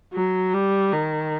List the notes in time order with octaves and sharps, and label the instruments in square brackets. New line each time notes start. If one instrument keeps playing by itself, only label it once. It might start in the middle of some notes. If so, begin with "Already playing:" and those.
[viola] F#3
G3
D#3